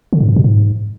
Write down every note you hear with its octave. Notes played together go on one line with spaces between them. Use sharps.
D3
G#2
G2
B2
G#2